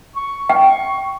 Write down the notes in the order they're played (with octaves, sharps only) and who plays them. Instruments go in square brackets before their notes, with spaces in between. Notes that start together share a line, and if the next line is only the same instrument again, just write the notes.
[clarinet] C#6
[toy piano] G5